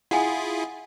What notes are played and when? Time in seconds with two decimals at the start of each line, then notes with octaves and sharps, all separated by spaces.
0.11 E4 F4 G#4 F#5 G#5